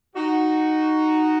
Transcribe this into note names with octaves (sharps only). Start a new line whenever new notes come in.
D#4 F#4